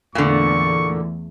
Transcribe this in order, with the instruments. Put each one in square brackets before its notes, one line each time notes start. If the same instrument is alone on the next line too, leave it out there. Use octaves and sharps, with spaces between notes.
[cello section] E2 A3 [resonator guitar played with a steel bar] A#2 D3 [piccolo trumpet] C#6